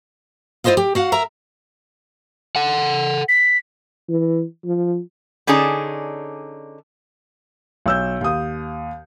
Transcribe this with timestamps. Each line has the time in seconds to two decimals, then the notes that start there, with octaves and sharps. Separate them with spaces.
0.64 E4 F4 G4 C5 D#5 F5
0.77 G4
0.95 F#4 F5 F#5
1.12 A#4 E5 A#5
2.56 A4 F#5
3.28 B6
4.09 E3
4.65 F3
5.47 D3 C#4 D#4 G#4 D5 A5
7.86 B1 E6 G6
8.21 D#2 D#6